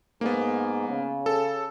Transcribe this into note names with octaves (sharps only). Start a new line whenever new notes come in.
G#2 A#3 B3
C#3
A4